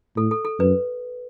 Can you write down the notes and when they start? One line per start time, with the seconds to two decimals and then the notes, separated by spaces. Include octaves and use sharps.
0.16 A2 A4
0.31 A4
0.45 A4
0.59 F#2 B4